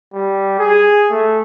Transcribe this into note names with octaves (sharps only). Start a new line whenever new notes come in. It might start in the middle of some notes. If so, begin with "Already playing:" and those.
G3
G#4
A3